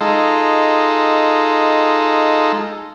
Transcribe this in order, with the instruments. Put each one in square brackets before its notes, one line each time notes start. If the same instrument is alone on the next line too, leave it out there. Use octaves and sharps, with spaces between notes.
[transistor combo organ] G#3 D#4 F4 A4